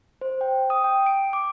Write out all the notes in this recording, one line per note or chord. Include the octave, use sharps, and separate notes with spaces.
C5
G5
D#6
G5
D7
D6